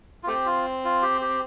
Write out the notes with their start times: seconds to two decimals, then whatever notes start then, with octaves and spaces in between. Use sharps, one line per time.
0.23 F4
0.27 A3 C4 G4
0.46 F4
0.84 F4
1.02 G4
1.21 G4